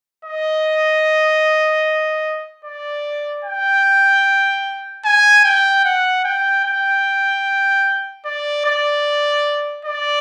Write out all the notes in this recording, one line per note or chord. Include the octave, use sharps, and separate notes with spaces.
D#5
D5
G5
G#5
G5
F#5
G5
G5
D5
D5
D5